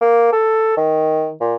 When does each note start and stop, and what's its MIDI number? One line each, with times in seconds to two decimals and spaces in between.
0.01 0.29 58
0.33 0.74 69
0.77 1.33 51
1.41 1.55 46